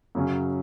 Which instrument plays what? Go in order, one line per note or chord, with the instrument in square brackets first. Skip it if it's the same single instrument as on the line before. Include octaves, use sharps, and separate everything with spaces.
[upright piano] F#2 C#3 F#3 C#4